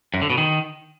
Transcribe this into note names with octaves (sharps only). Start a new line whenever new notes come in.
F#2
D3
B2
D#3